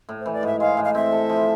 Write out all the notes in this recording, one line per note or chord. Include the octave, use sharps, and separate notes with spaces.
A2
C5
E3
D5
G#2 E5
G#3 F5
A2
F5
C4 E5
A4
F3